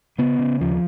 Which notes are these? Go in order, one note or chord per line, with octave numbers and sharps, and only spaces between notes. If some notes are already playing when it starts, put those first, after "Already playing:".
C#3 B3
C#3
D#2 F3